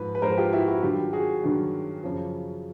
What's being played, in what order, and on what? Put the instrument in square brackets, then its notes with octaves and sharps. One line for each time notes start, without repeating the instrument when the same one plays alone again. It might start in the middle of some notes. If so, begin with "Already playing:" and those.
Already playing: [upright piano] G#2 F3 B4
B4
G#2 F3 A#4 C5
F4 G4
E4 F#4
E4 F#4
G2 D#3 F#3 F4 G4
F#4 G#4
G2 D#3 F#3
F#2 C#3 F3